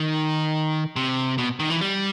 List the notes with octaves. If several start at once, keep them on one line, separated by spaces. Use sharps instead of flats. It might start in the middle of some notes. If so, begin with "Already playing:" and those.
Already playing: D#3
C3
B2
D#3
E3
G3